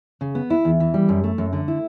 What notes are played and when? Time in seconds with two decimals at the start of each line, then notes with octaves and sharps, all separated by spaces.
0.21 C#3
0.35 B3
0.50 E4
0.65 E2
0.80 E3
0.94 G3
1.09 F#2
1.24 A3
1.38 F#2
1.53 D3
1.68 E4